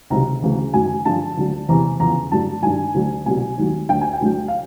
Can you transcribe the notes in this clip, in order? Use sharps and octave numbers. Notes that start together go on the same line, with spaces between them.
C#2 C3 D#3 F#3 A#5
D2 C#3 E3
F#2 D#3 F#3 G#5
G2 D3 F3 A5
D2 D3 F#3
E2 C3 E3 A#5
E2 C#3 F3 A#5
G2 D3 F#3 A5
G2 D#3 F#3 G#5
D2 D3 F#3
C2 B2 F#3 G#5
D#2 D#3 F#3
D2 D3 F#3 G5
G#5
G5
D2 D3 F#3
F5